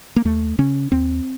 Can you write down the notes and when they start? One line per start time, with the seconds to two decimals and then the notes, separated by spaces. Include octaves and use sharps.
0.16 A#3
0.25 D#2 A3
0.58 C#3 C#4
0.92 D#2 C4